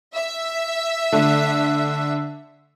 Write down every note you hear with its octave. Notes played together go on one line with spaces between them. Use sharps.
E5
D3 A3